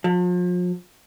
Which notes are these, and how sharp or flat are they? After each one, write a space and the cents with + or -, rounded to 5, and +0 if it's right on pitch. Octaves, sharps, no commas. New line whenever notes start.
F3 +40